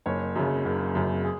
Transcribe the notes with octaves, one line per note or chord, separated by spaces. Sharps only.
F#1 C#5
F#2 C#3
F#1
F#2 C#3
G#4